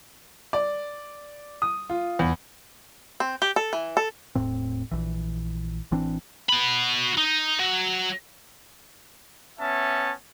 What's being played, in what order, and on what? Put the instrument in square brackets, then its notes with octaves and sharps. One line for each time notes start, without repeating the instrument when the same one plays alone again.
[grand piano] D5
D#6
F4
E2
[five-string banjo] C4
G4
A4
E3
A4
[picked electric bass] E1 A2 C4
A#1 E3
A1 E3 C4 D4
[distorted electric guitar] F#4 B5
D#4
F#3
[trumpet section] B3 C#4 E5 A5